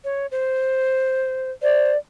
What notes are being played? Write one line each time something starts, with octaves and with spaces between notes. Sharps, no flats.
C#5
C5
C5 D5